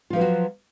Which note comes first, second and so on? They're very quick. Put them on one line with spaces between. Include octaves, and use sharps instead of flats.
F4 F3 B4 F#3 F#4